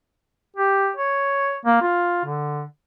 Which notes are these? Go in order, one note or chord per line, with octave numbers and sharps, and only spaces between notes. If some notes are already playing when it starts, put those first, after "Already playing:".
G4
C#5
A#3
F4
D3